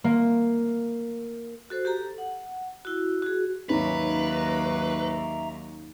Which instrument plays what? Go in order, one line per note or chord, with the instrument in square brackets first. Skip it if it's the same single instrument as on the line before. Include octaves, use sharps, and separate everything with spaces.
[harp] A#3
[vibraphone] F#4 A4 C5
G4 A4 A#5
F#5
E4 F#4
F#4 G#4
[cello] D#2 F#3 [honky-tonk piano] G#2 C#4 [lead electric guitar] B4 [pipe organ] E5 A#5